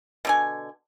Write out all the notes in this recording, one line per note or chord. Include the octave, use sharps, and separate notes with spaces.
B2 D3 G#5